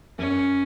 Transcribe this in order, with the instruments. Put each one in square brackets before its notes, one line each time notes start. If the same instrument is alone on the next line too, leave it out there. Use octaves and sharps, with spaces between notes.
[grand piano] F#2 [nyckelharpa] C#4